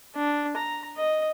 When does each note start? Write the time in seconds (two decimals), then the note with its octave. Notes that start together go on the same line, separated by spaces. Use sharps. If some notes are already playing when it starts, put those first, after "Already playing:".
0.16 D4
0.57 A#5
0.97 D#5